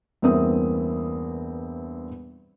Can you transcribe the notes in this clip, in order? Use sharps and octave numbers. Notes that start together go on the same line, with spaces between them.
E2 G2 A#3 C4 E5 D#6